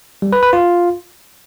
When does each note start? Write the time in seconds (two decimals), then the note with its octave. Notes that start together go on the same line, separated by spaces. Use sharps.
0.22 G3
0.33 B4
0.43 B4
0.53 F4